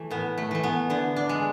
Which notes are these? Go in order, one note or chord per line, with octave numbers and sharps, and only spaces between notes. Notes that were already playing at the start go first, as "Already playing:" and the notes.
Already playing: E3 A3
A2 B3
A3
E3 A3
B3
D3 B3
D4
G#3